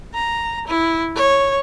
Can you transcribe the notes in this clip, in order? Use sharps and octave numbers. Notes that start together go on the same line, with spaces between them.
A#5
E4
C#5